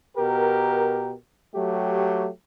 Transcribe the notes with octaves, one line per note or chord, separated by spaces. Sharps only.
B2 G4 A#4
F#3 A3 G4